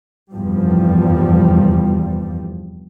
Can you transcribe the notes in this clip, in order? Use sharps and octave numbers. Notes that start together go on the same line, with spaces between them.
F1 E2 G2 F3 G3